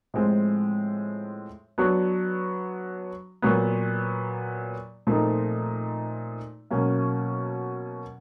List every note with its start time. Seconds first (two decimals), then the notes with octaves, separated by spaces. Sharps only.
0.14 A2 F3 G#3 C4
1.78 F#3 B3 D4 F#4
3.42 A#2 F#3 B3
5.07 A#2 F3 A3 C4 D#4
6.71 B2 F#3 A#3 C#4